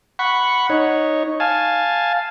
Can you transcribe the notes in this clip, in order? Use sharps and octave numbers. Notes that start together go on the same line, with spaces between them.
F#5 B5 C#6
D#4 C#5
F5 G#5 A5